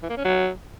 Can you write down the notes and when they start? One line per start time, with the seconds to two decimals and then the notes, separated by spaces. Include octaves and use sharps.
0.03 E3
0.10 A#3
0.17 C#4
0.25 F#3